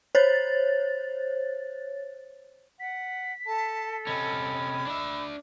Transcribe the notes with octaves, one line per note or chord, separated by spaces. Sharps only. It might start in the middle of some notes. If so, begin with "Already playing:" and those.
C5 C#5 A6
F#5 B6
A4 A5
C3 C#4 D#5 B5
D4 E5